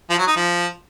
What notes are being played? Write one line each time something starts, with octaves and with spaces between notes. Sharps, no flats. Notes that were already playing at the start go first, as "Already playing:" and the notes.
F3
F#3
D#4
F3